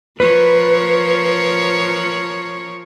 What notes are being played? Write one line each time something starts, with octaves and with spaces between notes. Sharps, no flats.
F3 A#4 B4 C#5